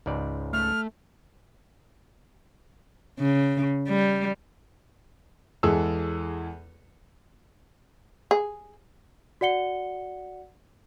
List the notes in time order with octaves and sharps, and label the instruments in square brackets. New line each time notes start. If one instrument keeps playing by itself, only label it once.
[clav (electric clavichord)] C#2 G#2 D5
[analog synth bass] A3 [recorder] F6
[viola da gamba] C#3
G3
[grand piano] E2 E3 G#3 G#4 A4 E6
[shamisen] G#4
[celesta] F#4 D5 F#5 C#7 G7